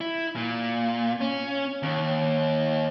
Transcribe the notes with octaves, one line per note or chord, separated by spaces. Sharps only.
E4
A#2
C#4
D#2